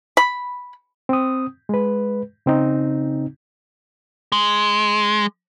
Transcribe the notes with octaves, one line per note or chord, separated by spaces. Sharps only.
B5
C4 D#6
G#3 B4
C#3 C4 D#4
G#3